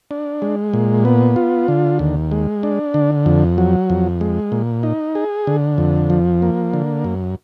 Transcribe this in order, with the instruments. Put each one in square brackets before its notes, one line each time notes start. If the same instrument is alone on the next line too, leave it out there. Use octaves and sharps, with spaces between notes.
[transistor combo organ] D4
G#3
A#2
B3
F4
D3
D#2
G#3
D4
D3
F2
F#3
F2
G#3
A#2
D#4
G#4
D3
F2
F3
A#3
D3
F#2